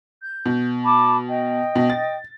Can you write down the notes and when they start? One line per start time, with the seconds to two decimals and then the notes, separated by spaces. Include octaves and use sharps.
0.21 G6
0.46 B2
0.83 A5 B5 D6
1.27 D#5 G5
1.76 B2
1.90 A6